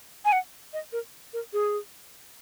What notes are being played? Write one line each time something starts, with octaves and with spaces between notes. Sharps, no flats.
G#5
F#5
D#5
A#4
A#4
G#4